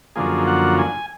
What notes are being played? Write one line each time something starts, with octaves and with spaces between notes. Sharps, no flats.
F#2 D3 F3 A#3 G#4
F#5
G#5